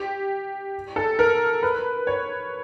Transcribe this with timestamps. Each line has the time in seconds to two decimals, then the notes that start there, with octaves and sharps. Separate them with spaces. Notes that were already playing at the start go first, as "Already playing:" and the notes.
Already playing: G4
0.96 A4
1.19 A#4
1.63 B4
2.07 C#5